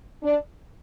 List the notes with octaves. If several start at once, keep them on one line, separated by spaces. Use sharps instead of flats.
D4